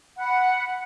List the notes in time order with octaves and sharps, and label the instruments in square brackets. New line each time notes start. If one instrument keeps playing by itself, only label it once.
[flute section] F#5 B5